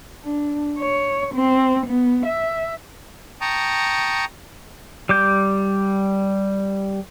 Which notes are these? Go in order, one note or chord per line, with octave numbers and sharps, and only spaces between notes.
D4
C#5
C4
B3
E5
G5 A5 A#5 C#6 D#6
G3 D6 G6